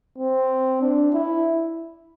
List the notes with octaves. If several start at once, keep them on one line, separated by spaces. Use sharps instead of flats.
C4
D4
E4